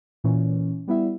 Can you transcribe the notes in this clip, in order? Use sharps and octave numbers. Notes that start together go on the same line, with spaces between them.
A#2 E3 C#4
G3 B3 E4 E5